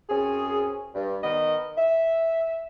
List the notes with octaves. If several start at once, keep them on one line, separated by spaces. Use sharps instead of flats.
F#2 C4 C#4 G#4
G2
D#3 B3 D#5
E5